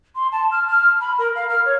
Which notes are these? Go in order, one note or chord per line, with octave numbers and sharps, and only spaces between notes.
C6
A5
F6
F6
B5
A#4
F5
F6
C#5